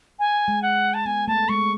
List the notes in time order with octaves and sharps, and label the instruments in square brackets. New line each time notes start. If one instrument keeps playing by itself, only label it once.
[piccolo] G#5
[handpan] G#3
[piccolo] F#5
A5
[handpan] B3 [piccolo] G#5
[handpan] A3 [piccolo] A5
[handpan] G#3 [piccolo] C#6